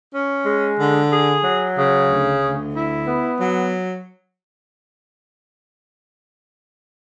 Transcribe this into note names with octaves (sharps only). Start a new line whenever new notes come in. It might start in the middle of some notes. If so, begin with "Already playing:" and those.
C#4
G#3
D3
G#4
F#3
C#3
D2
D2
E4
B3
F#3